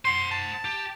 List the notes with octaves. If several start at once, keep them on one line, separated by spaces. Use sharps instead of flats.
C5 F#5 C6
A5
G4